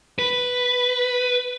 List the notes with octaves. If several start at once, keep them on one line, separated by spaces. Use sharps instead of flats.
B4